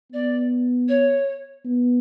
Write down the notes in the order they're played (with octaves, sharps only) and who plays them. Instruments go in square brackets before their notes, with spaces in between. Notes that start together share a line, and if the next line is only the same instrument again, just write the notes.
[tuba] B3 [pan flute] D5
[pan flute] C#5
[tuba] B3